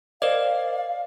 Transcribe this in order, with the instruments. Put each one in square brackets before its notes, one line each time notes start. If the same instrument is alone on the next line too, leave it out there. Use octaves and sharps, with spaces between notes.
[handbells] A#4 C5 D#5 [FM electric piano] D5 [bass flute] F5